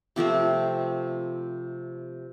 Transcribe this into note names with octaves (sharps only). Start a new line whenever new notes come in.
C3 F3 A3 C4